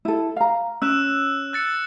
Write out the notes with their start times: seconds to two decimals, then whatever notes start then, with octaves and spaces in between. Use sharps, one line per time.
0.05 E4 A4
0.36 F5 A#5
0.82 C#4 E6 F#6 E7
1.53 F#6 A6 C#7